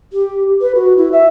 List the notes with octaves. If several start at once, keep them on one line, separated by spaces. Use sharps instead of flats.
G4
B4
F#4
E4
E5